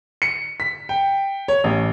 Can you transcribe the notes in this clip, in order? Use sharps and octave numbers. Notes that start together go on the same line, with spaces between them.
C#7
B6
G5
C#5
A1